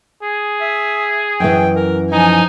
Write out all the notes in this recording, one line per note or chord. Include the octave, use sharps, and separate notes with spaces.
G#4
E5
F#2 E3 G5
A#4
F3 D#4 G#5